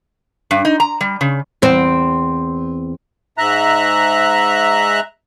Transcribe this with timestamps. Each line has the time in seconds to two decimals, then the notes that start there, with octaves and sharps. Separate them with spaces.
0.51 G2
0.65 D#4
0.80 A#5
1.01 G3
1.21 C#3
1.62 E2 C4
3.38 G#2 E5 A#5 F#6